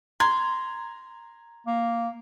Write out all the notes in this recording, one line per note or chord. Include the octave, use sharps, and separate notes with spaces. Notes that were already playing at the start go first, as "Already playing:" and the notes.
A#5 C6 G#6
A#3